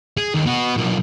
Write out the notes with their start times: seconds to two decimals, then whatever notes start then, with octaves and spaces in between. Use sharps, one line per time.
0.17 G#4
0.34 D#2
0.46 B3 F#4
0.77 B1 A#2